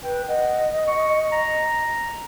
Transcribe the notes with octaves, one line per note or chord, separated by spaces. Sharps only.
B4 G5
D#5 F#5
C#6
A#5